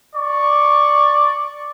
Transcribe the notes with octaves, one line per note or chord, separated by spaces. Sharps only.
D5 C#6